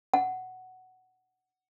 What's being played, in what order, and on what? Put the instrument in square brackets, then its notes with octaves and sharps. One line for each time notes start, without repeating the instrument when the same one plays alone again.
[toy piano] F#5